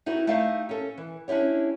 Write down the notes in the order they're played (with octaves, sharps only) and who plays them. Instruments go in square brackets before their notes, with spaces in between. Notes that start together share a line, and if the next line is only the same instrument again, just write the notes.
[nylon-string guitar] D#4 E4 F#4 G4 B4
A3 D#4 G4 E5 F5
C#4 A4
E3
C#4 D4 E4 G4 C#5